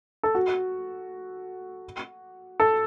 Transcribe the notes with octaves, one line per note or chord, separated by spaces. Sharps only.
A4
F#4
A4